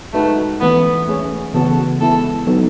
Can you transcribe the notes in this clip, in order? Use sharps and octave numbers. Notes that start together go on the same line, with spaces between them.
G#3 A3 D#4 F#4 B4
E3 A3 B3 C#4 E4 A4
A3 C#4 G#4 C#5
C#3 E3 B3 F#4 A4
G#3 B3 E4 A4
F#3 B3 D#4 A4